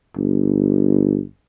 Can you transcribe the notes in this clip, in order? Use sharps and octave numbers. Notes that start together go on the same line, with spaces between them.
G1